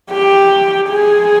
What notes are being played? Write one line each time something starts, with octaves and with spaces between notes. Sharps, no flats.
G4
G#4